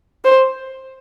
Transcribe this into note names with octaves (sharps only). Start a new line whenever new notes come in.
C5